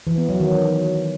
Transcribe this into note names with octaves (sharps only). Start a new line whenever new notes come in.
E3
B3
F#3
D#3